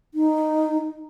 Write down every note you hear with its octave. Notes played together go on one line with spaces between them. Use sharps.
D#4